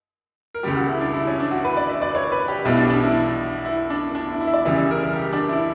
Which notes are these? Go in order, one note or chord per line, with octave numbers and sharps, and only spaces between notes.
A#4
C#2 C#3 G3 G4
F#4
E4
D4
E4
C#4
D4
F#4
B4
D5
E5
D5
C#5
B4
G4
B1 B2 G3 E4
D4
D4
E4
E4
D4
D4
E4
E4
E5
D5
C#2 C#3 E3 G3 E5
E5
A#4
A#4
G4
D4
E4